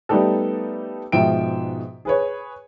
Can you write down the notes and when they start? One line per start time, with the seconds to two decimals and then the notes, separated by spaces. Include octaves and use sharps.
0.09 G3 A3 B3 D#4 G4 A4
1.12 G#2 B2 F3 E5 G5 D7
2.05 G#4 B4 C#5